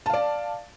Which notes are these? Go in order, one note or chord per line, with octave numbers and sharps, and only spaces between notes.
D5 F5 A5